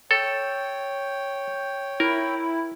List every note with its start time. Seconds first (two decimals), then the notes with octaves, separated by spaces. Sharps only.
0.11 A4 C#5 G5
2.00 E4 A#4